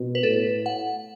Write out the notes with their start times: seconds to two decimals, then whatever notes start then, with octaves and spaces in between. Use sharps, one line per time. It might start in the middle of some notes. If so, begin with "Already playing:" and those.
Already playing: B2
0.15 B4
0.23 A2 A4
0.66 F#5